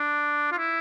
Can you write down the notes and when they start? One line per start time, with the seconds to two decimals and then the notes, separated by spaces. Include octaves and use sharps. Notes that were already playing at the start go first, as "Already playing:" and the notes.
Already playing: D4
0.52 F4
0.58 E4